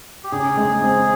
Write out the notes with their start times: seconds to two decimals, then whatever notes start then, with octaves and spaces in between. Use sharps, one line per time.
0.24 G4
0.32 C#3 G#4
0.57 G#3
0.82 C4